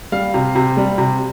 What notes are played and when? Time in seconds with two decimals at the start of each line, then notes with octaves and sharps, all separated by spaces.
0.12 G3 F5
0.34 C3
0.55 C3
0.77 G3
0.98 C3